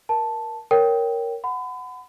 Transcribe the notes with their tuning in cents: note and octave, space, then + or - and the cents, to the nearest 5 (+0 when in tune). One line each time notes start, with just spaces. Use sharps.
A#4 +25 A5 +0
A#4 +0 C#5 +0 G5 +0
F#5 +0 B5 +40